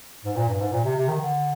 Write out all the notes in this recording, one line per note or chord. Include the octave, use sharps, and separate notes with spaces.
G#2
A#2
G2
G#2
A#2
C3
C3
D#3
D3